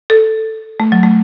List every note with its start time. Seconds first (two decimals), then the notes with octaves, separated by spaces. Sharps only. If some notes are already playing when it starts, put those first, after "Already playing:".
0.10 A4
0.80 A3
0.92 F#3
1.03 A3